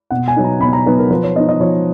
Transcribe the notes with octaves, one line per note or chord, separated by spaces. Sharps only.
B2 F#5
G#5
F#3 B3 D#4
A#5
B2 B5
A#5
F#3 B3 D#4 B4
A#4
F3 B4
C#5
B3 D#4 D#5
D#5
F3 C#5